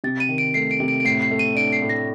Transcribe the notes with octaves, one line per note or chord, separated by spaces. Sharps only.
C3 A6
D#7
D#3
D7
A3 C7
D7
C3
D7
D7
A2 C7
C7
A3
D#7
D4 D7
C7
A2
A#6